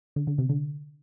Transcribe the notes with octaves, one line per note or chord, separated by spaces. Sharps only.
D3
D3
C3
D3